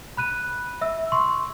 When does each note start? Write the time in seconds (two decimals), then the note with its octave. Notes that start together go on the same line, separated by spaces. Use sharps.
0.17 B5 F#6 D#7
0.81 E5 E6
1.12 C6 C#6